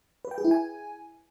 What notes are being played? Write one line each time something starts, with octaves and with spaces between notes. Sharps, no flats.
B4
G5
G#4
E4
G#5